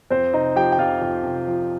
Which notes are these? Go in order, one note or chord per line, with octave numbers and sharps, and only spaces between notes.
F2 C4 C5
C3 D#4 D#5
F3 G4 G5
G5
F2 F4 F5
F2
C3
F3